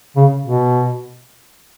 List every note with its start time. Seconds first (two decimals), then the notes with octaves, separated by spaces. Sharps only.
0.16 C#3
0.46 B2